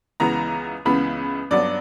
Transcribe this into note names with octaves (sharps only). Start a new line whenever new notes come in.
C#2 C#3 E3 B3 A#5
C#2 C#3 E3 B3 B5
G2 F#3 B3 D5